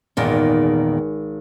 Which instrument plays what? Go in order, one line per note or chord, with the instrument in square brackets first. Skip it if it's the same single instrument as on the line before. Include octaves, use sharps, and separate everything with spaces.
[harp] G#1 [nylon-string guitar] E2 A#2 D#3